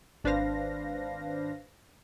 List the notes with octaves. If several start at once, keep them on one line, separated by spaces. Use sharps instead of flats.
G#1 D4 B4 C5 F5 A#6